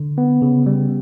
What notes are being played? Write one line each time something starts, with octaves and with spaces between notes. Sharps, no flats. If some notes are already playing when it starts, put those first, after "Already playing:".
Already playing: D3
B3
C#3
G3